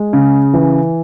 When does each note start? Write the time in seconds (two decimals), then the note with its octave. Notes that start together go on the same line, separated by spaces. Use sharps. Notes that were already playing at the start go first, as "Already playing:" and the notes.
Already playing: G#3
0.13 C#3
0.53 E3